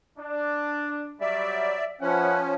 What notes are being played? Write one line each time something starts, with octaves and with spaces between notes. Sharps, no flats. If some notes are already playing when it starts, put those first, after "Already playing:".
D4
F#3 G3 D5 E5
F3 C#4 B4 E5 F#5